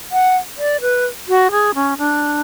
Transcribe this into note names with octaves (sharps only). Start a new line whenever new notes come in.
F#5
D5
B4
F#4
G#4
C#4
D4